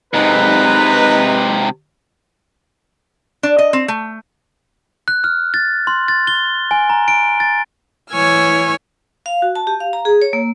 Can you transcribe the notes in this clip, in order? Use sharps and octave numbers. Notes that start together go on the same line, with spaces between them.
G#2 C3 D#4 B4
D4
D#5
C4
A3
F#6
F6
A6
C6
A6
G7
G#5
A#5
D7
A6
E3 C#5 G#5 E6 F6
F5
F#4
A5
G4
F5
A#5
G#4
C#5
A#3